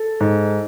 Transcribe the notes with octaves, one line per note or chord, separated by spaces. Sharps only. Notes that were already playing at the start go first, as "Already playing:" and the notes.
Already playing: A4
G#2